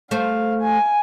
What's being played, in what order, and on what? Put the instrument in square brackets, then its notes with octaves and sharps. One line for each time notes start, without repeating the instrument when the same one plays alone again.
[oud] A3 C5 [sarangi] F5
[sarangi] G#5